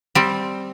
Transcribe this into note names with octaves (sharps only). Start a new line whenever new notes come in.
G3 C4